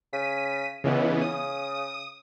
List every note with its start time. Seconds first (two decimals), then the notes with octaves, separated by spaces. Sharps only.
0.13 C#3 B6 D#7
0.84 C#2 C#3 E3 B3
1.21 C#3 D#6